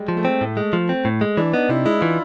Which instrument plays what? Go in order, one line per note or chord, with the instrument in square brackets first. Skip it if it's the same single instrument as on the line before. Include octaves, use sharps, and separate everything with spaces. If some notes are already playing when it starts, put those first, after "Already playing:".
Already playing: [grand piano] G3 G#3
[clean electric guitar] F3
[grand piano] A3
[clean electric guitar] C4
A2
G#3
F3
C4
A2
G#3
[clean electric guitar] E3 [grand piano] D4
[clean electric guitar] B3 [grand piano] D#4
[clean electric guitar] C3 [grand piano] E4
[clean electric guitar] G#3 [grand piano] E4
[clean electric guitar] E3 [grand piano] F4